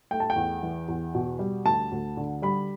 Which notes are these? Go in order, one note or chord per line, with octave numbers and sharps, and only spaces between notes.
A3 G5
A5
G5
E2
E3
E2
B2
G3
D2 A5
D2
D3
G3 B5